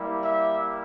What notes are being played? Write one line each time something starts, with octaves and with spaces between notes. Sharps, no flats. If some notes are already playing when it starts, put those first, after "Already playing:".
Already playing: G3 A#3 E4 G4
E5